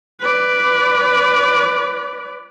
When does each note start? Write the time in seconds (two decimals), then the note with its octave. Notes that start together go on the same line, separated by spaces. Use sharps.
0.20 B4 D5